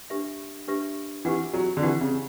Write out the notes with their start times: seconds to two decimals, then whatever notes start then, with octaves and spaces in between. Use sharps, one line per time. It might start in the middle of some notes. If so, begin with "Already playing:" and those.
0.10 D4 G4 B4 E5
0.67 D4 G4 B4 E5
1.25 E3 G4 B4 F#5
1.53 F#3
1.77 D3
1.82 E3 G4 B4 F#5
2.01 C#3